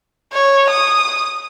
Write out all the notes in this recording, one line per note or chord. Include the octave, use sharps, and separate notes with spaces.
C#5
D#6